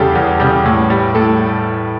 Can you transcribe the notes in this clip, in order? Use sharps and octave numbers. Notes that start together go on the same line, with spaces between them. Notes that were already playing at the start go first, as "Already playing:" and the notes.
Already playing: E2 C#3 G3 G4 A4
E2
C#3 G3
A2
G3
A2 A4